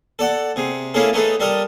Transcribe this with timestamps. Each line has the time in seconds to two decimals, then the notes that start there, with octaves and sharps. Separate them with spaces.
0.19 A4 D5 F#5
0.56 C3 G#4
0.94 A3 A#3 C#4 E4 G#4 A4
1.13 A3 B3 D#4 G#4 A4
1.40 G3 A4 A#4 D#5